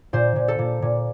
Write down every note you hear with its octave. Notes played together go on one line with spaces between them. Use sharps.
A#2 C5
A#2
A4
A#2
A#2